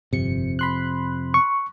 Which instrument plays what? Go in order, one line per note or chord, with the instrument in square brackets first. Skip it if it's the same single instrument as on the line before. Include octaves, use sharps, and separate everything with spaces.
[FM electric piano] G1 C#7 [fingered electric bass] F2 C3
[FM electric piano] B5 C6 F#6
[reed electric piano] C#6